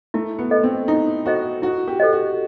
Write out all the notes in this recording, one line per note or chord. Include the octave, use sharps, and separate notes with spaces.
A3 E4
B3
A4 C5 D#5
C4
D#4 E4
F#4 A4 C5 D#5
E4 F#4
G4
A4 C5 D#5
F#4